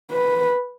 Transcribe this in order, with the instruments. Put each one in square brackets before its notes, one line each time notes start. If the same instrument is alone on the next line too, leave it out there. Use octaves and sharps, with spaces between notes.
[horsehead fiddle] B4